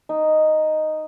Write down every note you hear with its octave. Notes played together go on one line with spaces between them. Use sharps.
D#4